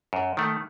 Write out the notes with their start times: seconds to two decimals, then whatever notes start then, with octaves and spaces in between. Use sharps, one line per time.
0.13 F#2
0.37 D#3 A3